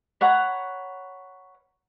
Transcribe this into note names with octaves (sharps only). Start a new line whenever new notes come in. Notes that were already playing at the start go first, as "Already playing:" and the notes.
B4 C#5 F#5 A#5